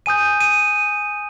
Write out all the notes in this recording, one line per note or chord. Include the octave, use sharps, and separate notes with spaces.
G#5 D#6 G6 D#7
D#7